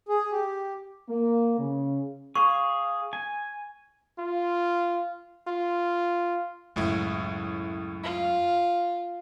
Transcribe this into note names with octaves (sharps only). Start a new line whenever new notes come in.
G#4
G4
A#3
C#3
G#4 F5 C#6
G#5
F4
F4
C#2 F#2 A2 E4
F4